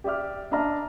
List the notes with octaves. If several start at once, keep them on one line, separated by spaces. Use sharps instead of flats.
G4 D5 E5 D6 F6
D4 D#5 E5 A5 A#5 F6